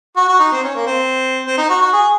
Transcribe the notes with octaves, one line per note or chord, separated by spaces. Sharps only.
F#4
F#4
D#4
C4
C#4
A#3
C4
C4
D#4
F#4
F#4
G#4